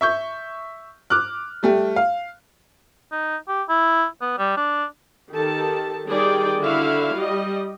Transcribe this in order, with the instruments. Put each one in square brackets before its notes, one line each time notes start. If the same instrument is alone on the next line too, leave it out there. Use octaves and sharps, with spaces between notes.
[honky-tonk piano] E5 C#6 G6
D6 F6 F#6
G3 A3 G4
F5
[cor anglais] D#4
G4
E4
B3
G3
D4
[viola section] D#3 G4 A4 A5
D#3 G3 G#4 D5 G5
D3 E4 F#4 E5 F5
G3 D#5